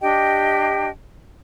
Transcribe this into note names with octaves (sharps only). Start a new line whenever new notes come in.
D4 G4 D#5 G5